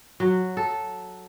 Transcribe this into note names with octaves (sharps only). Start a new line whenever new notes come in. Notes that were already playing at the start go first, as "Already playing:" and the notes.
F#3
A4